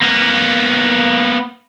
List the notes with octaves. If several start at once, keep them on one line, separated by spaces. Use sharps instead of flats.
A#3 B3